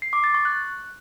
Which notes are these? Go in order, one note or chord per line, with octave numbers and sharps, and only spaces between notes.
C7
D6
A6
C#6
F#6